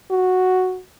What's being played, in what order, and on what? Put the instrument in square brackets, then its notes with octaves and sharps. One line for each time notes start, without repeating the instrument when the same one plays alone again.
[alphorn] F#4